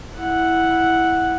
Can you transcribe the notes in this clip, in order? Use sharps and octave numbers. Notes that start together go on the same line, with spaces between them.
E4 F#5